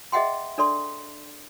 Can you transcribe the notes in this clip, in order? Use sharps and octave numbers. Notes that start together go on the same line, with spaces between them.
G#4 D#5 E5 F#5 G5 C6
D4 A4 D5 C6